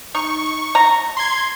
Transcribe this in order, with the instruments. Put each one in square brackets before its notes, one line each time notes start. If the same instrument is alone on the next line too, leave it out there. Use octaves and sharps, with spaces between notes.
[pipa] D#4 [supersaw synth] C#6
[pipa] A#5
[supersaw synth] C6 G#6